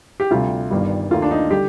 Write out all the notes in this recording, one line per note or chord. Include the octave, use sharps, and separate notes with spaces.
G4
D2 C3 G3 F4
G1 G2 D#3 G3
D#2 D#3 A3 F4
D4
D#4
D3 G3 G4